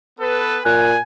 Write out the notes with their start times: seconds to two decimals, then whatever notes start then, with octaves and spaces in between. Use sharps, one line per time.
0.20 B3 A4 B4
0.65 A#2 G#5 F#6